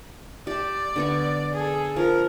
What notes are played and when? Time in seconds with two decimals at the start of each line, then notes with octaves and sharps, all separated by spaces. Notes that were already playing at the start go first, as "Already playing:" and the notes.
0.47 G4 D5 A5
0.96 D3 B3 C#6
1.53 G#4 A4
1.96 F3 A#4